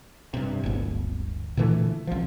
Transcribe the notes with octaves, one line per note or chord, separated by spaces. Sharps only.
G2 C3
D1 G1
A#2 D3 E3 A3
C2 F3